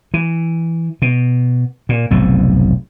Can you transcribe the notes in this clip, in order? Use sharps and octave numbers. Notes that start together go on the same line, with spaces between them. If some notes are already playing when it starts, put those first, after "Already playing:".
E3
B2
A#2
F1 B1 G#2